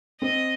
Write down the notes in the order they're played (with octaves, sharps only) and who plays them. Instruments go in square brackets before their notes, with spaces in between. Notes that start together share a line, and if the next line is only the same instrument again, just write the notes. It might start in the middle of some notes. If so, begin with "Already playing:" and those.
[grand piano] C4 [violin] D#5